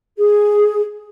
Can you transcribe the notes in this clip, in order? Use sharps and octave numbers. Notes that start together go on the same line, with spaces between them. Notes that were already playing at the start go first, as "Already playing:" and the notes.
G#4